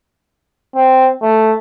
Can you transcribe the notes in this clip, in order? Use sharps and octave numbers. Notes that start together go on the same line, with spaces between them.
C4
A3